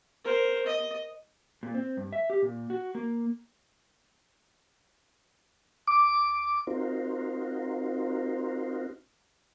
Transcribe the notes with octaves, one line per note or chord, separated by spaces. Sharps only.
A#4 C5
D#5
A#2
C4
G2
E5
G4
A#2
F#4
A#3
D6
C4 D#4 F4 F#4 A#4 C5